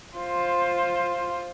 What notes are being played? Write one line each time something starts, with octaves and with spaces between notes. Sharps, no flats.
F4 C5